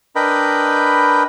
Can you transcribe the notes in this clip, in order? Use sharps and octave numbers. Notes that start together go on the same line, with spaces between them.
D4 A#4 B4 D#5 G5 B5